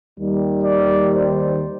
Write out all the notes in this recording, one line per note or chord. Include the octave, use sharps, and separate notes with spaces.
D#2 D#3 G3
D5
C5